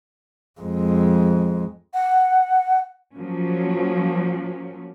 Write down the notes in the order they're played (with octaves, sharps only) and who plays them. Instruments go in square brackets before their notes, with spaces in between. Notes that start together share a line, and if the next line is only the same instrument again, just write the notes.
[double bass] F2 G#3
[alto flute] F#5
[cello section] F3 F#3 A#3 C#4